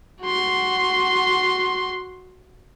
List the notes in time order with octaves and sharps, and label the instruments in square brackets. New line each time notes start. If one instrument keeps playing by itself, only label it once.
[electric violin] F#4 C6